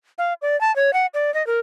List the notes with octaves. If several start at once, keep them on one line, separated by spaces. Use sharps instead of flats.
F5
D5
A5
C#5
F#5
D5
D#5
A#4